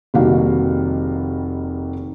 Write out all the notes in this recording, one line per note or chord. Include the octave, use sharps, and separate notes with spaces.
F1 D#3 G3 A#3 F#4 F5